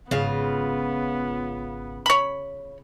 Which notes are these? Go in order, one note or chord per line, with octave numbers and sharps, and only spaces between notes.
G#1 C#3 B3 F4
C#5 B5